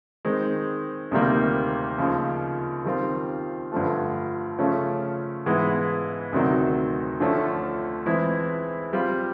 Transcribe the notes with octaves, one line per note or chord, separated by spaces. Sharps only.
D#3 G#3 C4
D2 C3 D#3 G3 A#3
D#2 C#3 F3
D#3 G3 C4 F4
G2 D3 F3 A3
C#3 F3 A3 C#4
G#2 E3 G#3 B3 E4
D2 C3 D#3 F#3
D2 D3 F3 A3 C#4
E3 G#3 C4 E4 G#4
G3 C4 F4